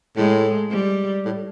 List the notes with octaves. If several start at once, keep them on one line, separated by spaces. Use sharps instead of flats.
A2 G#3
G3
A2